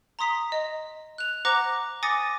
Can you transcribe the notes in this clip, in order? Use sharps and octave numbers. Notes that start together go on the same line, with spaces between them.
A#5 C6 D#6 B6
D#5
F#6 F7
C5 F#5 A#5 D6 F#6 A#6
G#5 D6 D#6 A6 A#6 C#7